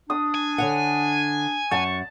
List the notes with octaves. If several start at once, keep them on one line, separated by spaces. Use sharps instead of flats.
D4 D#6
G#5
D3 C#5 F#5
F#2 F#5 A5 C#6